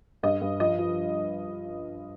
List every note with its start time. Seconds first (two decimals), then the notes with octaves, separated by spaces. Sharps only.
0.23 G2 D#5
0.41 G2
0.60 F3 D#5
0.79 F3